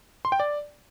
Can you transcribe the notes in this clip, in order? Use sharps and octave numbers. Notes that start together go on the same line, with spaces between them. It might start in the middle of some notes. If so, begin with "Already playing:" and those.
C6
G5
D5